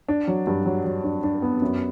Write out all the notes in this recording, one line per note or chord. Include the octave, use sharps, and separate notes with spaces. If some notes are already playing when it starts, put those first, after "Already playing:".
D4
F#3
G2
F#3
F#3
D4
D4
B3
F#2